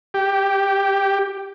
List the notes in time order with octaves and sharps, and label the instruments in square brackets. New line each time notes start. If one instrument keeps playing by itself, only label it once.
[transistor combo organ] G4